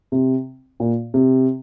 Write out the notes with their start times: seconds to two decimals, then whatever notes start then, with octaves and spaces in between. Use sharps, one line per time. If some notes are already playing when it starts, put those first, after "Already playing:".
0.12 C3
0.80 A#2
1.14 C3